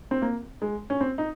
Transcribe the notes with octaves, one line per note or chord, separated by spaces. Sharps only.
C4
A#3
G#3
C#4
C4
D#4